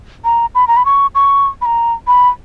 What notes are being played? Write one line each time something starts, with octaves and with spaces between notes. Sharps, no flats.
A#5
B5
A#5
B5
C#6
C#6
B5
A#5
B5